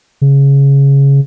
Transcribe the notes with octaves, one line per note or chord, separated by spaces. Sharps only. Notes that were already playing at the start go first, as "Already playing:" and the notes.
C#3